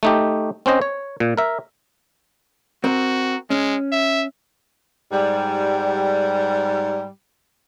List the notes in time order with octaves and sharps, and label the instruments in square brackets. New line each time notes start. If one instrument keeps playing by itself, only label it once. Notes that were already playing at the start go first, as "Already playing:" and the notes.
[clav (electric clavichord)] A3 D#4 G4
C4 C#4 C5 D#5
C#5
A#2
A#4 E5
[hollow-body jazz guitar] C4 A#4 [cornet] F#4
[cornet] G#3 [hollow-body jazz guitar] C#4
[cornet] E5
[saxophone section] G#2 G3